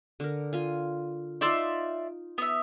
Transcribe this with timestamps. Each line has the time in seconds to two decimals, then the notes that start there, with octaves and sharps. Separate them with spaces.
0.20 D3 A#4
0.53 F4 G#5
1.41 D#4 F4 D5 E5 C6
2.38 B3 E5